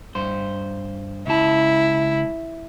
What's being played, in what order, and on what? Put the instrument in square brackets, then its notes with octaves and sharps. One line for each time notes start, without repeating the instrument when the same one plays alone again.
[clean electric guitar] G2 C5
[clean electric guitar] C#2 A5 [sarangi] E4